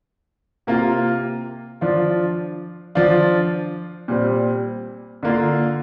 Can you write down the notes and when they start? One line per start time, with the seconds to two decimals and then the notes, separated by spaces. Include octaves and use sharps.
0.67 C3 A#3 F4
1.81 F3 D4 F4
2.95 F3 D4 F4
4.08 A#2 G3 C4
5.23 D3 A#3 F4